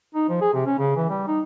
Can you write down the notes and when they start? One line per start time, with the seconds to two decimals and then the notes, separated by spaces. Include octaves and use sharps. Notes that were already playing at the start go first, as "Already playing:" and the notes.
0.14 D#4
0.29 F3
0.41 G#4
0.53 C3
0.66 C#4
0.78 C#3
0.96 E3
1.09 G3
1.27 D#4